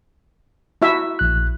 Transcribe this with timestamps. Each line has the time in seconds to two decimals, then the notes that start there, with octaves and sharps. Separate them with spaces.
0.82 E4 F#4 E5
1.19 A#1 F#6